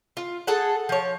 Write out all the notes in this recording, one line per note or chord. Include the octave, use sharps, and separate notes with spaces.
F4
G#4 A4 F#5
F3 C#5